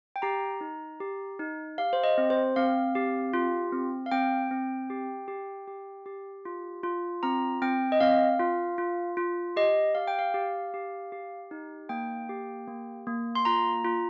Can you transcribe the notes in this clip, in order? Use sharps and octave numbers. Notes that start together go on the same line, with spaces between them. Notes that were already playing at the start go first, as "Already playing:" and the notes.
G5
G4 A#5
D#4
G4
D#4
G4 F5
C5
D#5
C4
C5
C4 F5
G4
F4
C4
F5
C4 G5
C4
G4
G4
G4
G4
F4
F4
C4 A#5
C4 G5
D#5
C4 F5
F4
F4
F4
G4 D#5
G4 F5
G5
F5
G4
G4
G4
D#4
A#3 G5
G4
A#3
A#3
C6
F4 A#5
F4